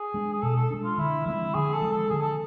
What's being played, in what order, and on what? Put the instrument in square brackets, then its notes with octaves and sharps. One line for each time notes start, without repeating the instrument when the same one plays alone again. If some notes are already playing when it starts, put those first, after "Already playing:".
Already playing: [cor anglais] G#4
[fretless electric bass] G#3 D4
[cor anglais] G#4
[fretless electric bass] B2 [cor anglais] A4
[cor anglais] A4
[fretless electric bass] G#3 D4
[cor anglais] F4
[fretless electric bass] D3 [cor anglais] E4
[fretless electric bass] F3 G#3 C4 [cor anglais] E4
[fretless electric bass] D3 [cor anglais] G#4
[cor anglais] A4
[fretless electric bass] F3 G#3 C4
[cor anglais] A4
[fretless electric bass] D3 [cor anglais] G#4
[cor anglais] A4